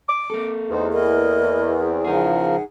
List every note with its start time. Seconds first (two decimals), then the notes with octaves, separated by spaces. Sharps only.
0.08 D6
0.30 A#3 A4
0.70 E2 D#4 C5
0.93 E4 A#4 D#5
1.79 C4
2.05 C#3 F3 D#4 G#4 A#4 F#5